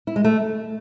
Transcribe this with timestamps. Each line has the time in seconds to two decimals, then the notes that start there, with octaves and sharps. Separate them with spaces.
0.07 E4
0.16 G#3
0.24 A3